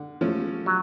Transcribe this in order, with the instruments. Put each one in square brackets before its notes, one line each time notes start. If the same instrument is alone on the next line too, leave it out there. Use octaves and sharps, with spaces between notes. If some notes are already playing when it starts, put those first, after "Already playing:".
Already playing: [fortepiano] D3
F3 A3 C#4
[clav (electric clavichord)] F#3